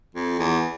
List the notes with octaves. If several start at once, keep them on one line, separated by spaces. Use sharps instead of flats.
F2
E2